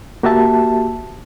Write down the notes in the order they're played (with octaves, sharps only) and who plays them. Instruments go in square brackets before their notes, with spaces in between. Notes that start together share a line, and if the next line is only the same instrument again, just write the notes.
[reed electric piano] A#3 F#4 G4 E5 A5